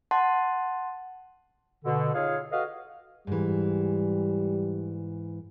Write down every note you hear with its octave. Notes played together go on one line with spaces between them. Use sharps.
F#5 A5 C6
B2 D3
D#4 F4 G#4 C#5 F5
F#4 A4 B4 D#5 F5
G#2 E3 G3